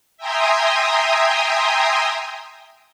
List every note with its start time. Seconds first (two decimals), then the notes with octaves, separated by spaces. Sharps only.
0.17 E5 G5 G#5 A#5 C6 D#6